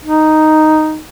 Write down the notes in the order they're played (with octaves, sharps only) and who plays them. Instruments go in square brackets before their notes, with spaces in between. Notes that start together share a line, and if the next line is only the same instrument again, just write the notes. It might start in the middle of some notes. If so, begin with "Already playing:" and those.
[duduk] D#4